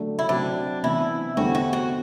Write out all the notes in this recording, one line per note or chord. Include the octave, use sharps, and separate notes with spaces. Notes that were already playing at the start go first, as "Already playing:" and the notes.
Already playing: D3 F#3 A3 D4 G4
E4
C3 F#3 C4 D4
C3 E3 B3 E4
E2 D3 G3 C4 F#4
F#4
F#4